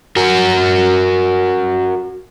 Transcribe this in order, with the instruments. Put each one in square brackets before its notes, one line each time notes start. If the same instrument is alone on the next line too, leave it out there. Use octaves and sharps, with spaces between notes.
[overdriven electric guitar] F#4 A#4